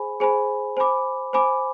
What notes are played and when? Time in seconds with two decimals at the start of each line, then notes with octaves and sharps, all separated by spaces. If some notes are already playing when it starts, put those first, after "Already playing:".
Already playing: G#4 C5 G#5 B5
0.20 G#4 C5 G#5 B5
0.77 C5 G#5 B5 D6
1.33 C5 G#5 B5 D6